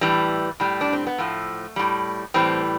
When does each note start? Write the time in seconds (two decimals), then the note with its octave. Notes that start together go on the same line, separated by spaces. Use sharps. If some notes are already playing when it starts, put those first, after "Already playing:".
0.01 A2 E3 G3
0.60 A2 G3
0.81 D4
0.93 C4
1.07 B3
1.18 A2 F3 A3
1.76 A2 G3
2.34 A2 E3 G3 C4